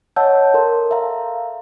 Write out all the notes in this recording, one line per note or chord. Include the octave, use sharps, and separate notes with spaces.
C#5 D#5 F#5 A5 E6 G6
A4 A#4 A5 C6
E5 F5 A#5